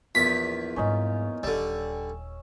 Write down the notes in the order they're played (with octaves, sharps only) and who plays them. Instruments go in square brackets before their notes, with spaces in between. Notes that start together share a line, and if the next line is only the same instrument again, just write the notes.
[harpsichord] A#1 E2 [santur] F4 [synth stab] B6
[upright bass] G#2 G3 [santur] C#4 D#4
[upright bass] D#1 D#2 [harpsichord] D3 G3 [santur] E6